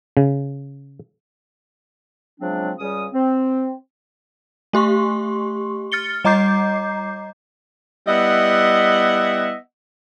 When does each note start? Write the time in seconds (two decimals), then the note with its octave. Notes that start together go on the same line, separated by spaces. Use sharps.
0.17 C#3
2.40 C#3 F3 F#3 G#3 C4 D4
2.79 C#2 C#3 G3 C#4 D#6
3.12 C4
4.73 A3 G4 C6 C#6
5.92 F6 A6 C#7 G7
6.24 G3 D#5 A#5 D6 G6 C7
8.07 G3 B3 E4 D#5 E5 F#5